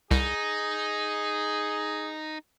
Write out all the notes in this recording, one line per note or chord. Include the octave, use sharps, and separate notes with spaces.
C2 D#4 G#4